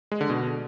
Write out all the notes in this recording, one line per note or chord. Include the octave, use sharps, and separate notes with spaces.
G#3
D3
B2